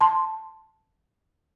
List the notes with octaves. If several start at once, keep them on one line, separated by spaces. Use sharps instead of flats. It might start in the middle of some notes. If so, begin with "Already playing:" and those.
A5 C6